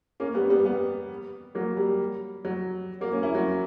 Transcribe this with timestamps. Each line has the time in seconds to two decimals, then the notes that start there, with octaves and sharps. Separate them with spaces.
0.20 A#3 C#4
0.34 G3 B3
0.49 G3 B3
0.65 G3 B3
1.55 F#3 A#3
1.77 G3
2.45 F#3
3.01 F#3 A#3
3.12 A#3 C#4
3.23 C#4 E4
3.35 F#3